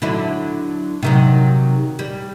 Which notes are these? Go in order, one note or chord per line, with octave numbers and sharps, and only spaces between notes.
D3 F#3 E4
C3 D#3 F#3
G3